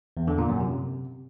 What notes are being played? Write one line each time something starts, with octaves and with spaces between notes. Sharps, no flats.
E2
D3
A#2
F#2
C3